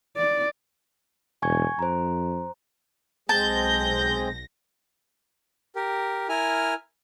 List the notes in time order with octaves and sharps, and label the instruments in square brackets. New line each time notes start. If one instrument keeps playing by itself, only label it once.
[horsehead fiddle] D5
[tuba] E1 [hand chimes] G#5 C#6 G#6
[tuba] F2 [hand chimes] C5 A#5
[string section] B1 A#6 [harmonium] G#3 C4 G#4 [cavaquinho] A5 [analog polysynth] G6
[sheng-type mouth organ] G4 A#4
E4 A#4 G#5 F6